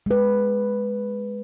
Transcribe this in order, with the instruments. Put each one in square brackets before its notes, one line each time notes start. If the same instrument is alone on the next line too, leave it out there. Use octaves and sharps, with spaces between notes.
[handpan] G#3 B4